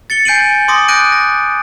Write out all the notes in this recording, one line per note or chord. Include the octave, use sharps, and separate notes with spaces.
A6 C#7 G7
G#5 G6 C7 D7 D#7 F#7
C6 D6 D#6 A#6
D6 F#6 G6 A#6 D7 D#7
A#6